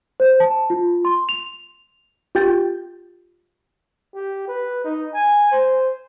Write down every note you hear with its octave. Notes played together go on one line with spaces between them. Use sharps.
C5
A5
F4
C6
F7
F4 G4 G5 G6 A6
G4
B4
D#4
G#5
C5